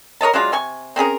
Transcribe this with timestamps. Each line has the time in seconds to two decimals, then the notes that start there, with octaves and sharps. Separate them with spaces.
0.21 A#4 C#5 D#5 A5
0.34 F#3 G#3 D4 F4
0.52 C3 G#5 C#6
0.96 C4 C#4 G#4 A#4